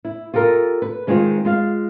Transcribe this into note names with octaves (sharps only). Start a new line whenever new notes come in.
E4
F4 G4 A4 A#4
B4
D#3 G#3 C4 D#4 F4 C5
G#3 F4 F5